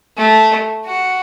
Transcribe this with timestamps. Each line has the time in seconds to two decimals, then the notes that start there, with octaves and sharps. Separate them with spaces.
0.17 A3
0.85 F#4